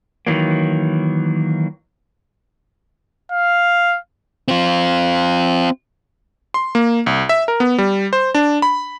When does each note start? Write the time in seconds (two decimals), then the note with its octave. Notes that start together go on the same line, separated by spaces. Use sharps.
0.27 D#3 E3 F#3 A#3
3.32 F5
4.48 C4 F4
6.54 C6
6.75 A#3
7.06 C2
7.29 E5
7.48 A#4
7.60 B3
7.78 G3
8.13 C5
8.34 D4
8.62 B5